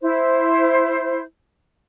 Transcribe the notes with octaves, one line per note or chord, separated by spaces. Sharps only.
E4 C5